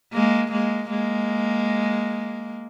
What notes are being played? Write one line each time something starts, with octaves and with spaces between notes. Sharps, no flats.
G#3 A#3
G#3 A#3
G#3 A#3